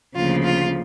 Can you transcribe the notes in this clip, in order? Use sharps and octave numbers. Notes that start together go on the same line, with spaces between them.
D2 C#3 F3 A#3 F4
F4